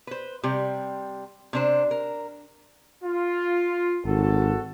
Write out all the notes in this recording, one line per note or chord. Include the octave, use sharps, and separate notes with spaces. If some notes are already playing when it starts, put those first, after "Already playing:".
B4 C5
C3 G3 G5
C3 D4 C5
A#4
F4
G#1 G#2 F#4 A4